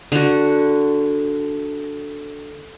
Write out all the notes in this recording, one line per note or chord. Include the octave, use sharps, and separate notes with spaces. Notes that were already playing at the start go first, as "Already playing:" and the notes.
D3 F#4